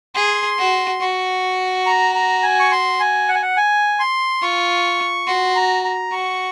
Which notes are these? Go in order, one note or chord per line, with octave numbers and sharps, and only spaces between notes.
G#4 C6
F#4
F#4 C#6
A#5
A#5
G#5
C#6
C6
G#5
F#5
G#5
F#5
G#5
C6
F4 C#6
F#4 C6
A#5
A#5
F#4 C#6